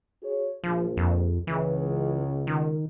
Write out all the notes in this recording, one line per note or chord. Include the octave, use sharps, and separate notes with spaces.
F#4 G#4 C#5
A#1 F3
F2
C#2 C#3 E3
D#3